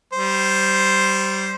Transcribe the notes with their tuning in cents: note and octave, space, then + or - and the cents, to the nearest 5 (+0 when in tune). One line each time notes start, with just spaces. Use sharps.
G3 -20 C5 +0